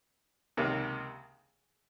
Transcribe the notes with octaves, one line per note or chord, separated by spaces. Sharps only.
C#2 C3 D#3 A#3